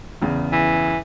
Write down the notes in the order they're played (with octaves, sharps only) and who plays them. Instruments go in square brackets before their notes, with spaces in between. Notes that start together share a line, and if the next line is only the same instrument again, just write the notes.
[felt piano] E2 C#3
[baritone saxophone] E3